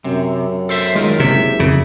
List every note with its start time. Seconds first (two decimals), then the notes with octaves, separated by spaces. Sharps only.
0.04 F#2 C3
0.69 A4 C5 E5
0.95 D#3 G#3 F4 A#4
1.20 F#1 C3 E5
1.60 F2 C#3